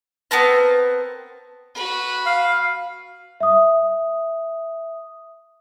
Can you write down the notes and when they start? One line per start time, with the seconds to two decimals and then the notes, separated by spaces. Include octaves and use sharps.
0.31 B3 C4 A#4 A5
1.75 F#4 B4
2.26 F5
3.40 E5 D#6